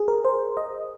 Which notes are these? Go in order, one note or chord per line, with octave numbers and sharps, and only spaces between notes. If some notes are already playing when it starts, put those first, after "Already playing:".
Already playing: G#4
A#4
C5
D#5